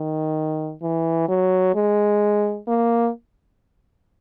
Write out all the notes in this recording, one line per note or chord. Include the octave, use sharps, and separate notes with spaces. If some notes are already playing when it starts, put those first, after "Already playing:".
Already playing: D#3
E3
F#3
G#3
A#3